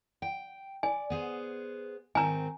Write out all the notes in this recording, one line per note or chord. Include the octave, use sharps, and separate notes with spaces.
G5
D5 G#5
B3 G#4 C5
G#2 D#3 C4 G#5 A#5